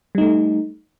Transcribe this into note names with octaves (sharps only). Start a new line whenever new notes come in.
G3 A3 D#4